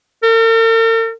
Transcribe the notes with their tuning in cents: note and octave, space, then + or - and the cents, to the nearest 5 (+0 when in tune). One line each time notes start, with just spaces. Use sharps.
A#4 -45